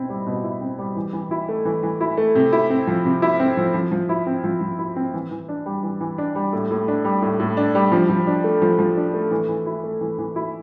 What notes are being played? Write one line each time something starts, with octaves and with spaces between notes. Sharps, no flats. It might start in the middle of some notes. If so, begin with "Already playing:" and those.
Already playing: B2 C4 E4
G3
B2
E4
C4
G3
E3
E3
E4
A3
E3
E3
E4
A3
C3
E4
C4
F3
C3
E4
C4
F3
F3
F3
E4
C4
F3
F3
E4
C4
E3
E3
D4
G3
E3
E3
D4
G3
A2
A2
D4
G3
A2
A2
D4
G3
F3
F3
D4
A3
F3
F3
D4
A3
E3
E3
E4
A3
E3
E3
E4